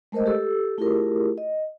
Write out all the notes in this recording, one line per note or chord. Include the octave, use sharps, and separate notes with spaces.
G#3 A3 A#4 C5 D#5
G4 A4 E6
A3 E4 F4 G4 G#4 A#4
D#5